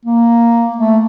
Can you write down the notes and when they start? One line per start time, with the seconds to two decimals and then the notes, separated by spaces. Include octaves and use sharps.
0.05 A#3
0.76 A3